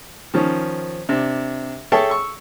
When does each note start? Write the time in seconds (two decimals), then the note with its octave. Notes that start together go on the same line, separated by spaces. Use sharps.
0.34 D#3 F3 C#4
1.09 C3 D4
1.92 G#4 A4 C#5 E5 G5 A5
2.09 C#6 E6